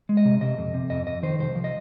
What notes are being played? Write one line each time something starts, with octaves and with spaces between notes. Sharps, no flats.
G#3
D#5
C3
C3 D#5
F2
C3
F2 D#5
F2 D#5
D#3 C5
C2 C5
F3
D#5